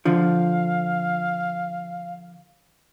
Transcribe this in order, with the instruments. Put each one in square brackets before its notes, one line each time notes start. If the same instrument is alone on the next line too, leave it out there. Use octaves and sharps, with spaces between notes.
[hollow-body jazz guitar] D3 F3 [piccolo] F5